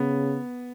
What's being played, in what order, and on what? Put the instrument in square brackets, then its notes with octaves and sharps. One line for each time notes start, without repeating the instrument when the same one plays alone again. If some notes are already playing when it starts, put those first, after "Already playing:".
Already playing: [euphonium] C#3 [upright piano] B3